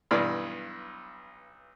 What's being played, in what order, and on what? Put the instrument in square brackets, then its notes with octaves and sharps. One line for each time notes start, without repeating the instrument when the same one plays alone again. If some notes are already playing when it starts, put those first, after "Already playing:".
[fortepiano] B1 G2 E3 D5 F6